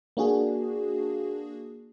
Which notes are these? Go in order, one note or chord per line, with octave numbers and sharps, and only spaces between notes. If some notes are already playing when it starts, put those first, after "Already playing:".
A#3 D4 F#4 G#4